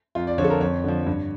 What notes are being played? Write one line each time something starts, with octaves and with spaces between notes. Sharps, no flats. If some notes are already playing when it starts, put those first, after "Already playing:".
F2 F4
D5
D3 F3 C#5
A4
A#4
F2 C#5
D3 F3
G2